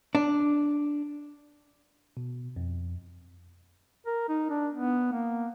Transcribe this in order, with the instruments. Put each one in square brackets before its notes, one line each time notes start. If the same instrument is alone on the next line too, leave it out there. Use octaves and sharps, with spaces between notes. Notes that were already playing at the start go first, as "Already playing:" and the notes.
[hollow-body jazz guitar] D4
[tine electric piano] B2
F2
[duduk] A#4
D#4
D4
B3
A#3